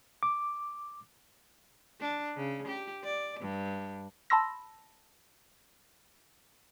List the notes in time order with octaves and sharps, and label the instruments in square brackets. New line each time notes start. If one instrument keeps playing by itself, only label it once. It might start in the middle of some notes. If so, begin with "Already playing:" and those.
[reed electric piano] D6
[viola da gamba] D4
C#3
G4
D5
G2
[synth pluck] A5 B5 C6 E6 A#6